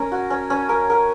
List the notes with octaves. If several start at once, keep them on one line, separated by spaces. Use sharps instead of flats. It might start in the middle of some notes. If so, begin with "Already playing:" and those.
Already playing: C#4 A#4
F#4
C#4
C#4
A#4
A#4